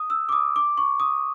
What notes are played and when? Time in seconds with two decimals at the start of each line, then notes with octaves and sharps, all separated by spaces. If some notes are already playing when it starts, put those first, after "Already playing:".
Already playing: D#6
0.10 E6
0.29 D6
0.32 D#6
0.56 D6
0.78 C#6
1.00 D#6